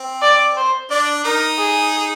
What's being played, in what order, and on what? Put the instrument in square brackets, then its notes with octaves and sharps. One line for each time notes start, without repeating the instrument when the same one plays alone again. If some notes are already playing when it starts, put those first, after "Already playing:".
Already playing: [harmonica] C4
[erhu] D5
C5
[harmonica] D4 [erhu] D5
[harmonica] D#4 [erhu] A#4
[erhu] G#4